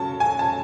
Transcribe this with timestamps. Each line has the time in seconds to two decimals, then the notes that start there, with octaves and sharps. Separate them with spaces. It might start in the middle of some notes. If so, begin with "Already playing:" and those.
Already playing: C#3 F#3 A5
0.20 G#5
0.39 A5